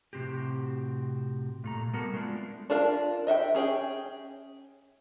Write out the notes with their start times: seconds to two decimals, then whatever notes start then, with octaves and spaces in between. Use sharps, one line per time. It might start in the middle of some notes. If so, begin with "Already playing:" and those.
0.13 A2 C3 C4 F#4 G4
1.64 A#2 A3 A#5
1.93 G3 B3 F#4 A4 A#4
2.14 G#3 A3 B3 C4 D4 F4
2.70 D4 F4 A#4 F5 A5
3.27 D#5 E5 F#5 G5
3.54 C#4 G#4 C#5 G5